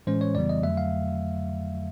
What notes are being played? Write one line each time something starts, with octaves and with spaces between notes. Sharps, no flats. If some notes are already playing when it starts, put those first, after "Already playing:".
A2 E3 G#3 C#4 C5
C#5
F2 C#3 E3 G3 B3 D5
D#5
F2 D3 F#3 A3 E5
F5